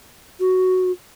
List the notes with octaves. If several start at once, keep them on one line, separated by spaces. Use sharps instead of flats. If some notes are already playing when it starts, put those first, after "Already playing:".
F#4